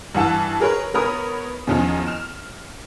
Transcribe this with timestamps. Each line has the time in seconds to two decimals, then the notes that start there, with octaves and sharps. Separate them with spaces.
0.15 G2 E3 F#5 A5 E6
0.60 G#4 A#4 B4 C#5
0.94 B3 A#4 C#5 B5 D#6
1.67 E2 D#3 F3 C#4 D#5
2.07 F6 E7